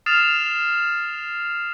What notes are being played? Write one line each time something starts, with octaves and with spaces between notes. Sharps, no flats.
D#6 F6 A6 C7 E7 F7